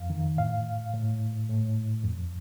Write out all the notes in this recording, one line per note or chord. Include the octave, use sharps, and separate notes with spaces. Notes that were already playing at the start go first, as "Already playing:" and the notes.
Already playing: F2 F5
D#3
A2 F5
A2
A2
F2